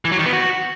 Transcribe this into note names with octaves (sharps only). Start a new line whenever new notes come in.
E3
F#3
D#3
B3
F#4